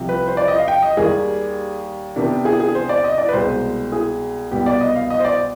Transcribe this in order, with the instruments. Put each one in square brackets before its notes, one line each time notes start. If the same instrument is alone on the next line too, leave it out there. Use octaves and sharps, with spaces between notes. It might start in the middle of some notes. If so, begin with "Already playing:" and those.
Already playing: [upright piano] C2 C3 F3
B4
C5
D5
D#5
F5
G5
D#5
D#2 D#3 G3 G#4
C3 D#3 B3 D4
G#4
G#4
C5
D5
D#5
D5
B4
C2 B2 G#3 C5
G#4
C2 B2 B3 G4
D5
D#5
F5
D#5
C5
D5